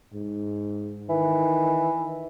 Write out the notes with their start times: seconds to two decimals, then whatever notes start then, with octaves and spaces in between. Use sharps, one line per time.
0.14 G#2
1.10 D#3 E3